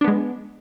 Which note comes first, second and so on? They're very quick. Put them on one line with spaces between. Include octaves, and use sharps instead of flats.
D4 B3 G#3